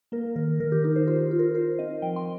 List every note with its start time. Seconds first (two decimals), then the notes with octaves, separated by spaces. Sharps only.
0.12 A#3 A#4
0.36 D#3 A#4
0.60 D#3 A#4
0.72 G4
0.84 D#4 A#4
0.96 C5
1.07 F4 C5
1.31 F4
1.39 A#4
1.54 F4 C5
1.79 C4 D#5
2.02 F3 G5
2.16 C6